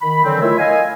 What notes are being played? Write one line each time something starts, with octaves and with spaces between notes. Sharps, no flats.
D#3 B5
D3 E3 F#3 C4
D#3 A3 E4 F4 C#5 E5
D#5 F5 G#5